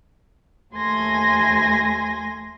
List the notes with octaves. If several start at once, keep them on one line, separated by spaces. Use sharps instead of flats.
D#2 A3 G#5 C6 G#6 A#6